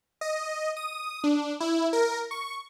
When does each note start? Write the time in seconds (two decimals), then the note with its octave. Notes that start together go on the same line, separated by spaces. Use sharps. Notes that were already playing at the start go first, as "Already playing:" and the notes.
0.21 D#5
0.77 D#6
1.24 D4
1.60 E4
1.93 A#4
2.31 C#6